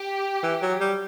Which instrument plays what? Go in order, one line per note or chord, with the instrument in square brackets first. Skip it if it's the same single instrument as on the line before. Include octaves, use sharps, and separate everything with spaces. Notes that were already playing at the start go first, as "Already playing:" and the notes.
Already playing: [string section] G4
[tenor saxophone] E3
F#3
G3